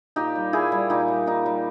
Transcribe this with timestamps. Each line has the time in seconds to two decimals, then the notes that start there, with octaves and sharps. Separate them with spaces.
0.16 A#2 D#4 G4
0.35 G3
0.53 A#2 E4 G#4
0.72 G3
0.90 A#2 D#4 G4
1.08 G3
1.26 A#2 D#4
1.46 G3